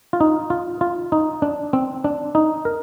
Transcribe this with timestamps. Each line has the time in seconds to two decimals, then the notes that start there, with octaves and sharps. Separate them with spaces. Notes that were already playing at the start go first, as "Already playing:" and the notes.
0.13 F4
0.21 D#4
0.50 F4
0.81 F4
1.12 D#4
1.42 D4
1.73 C4
2.04 D4
2.35 D#4
2.65 A#4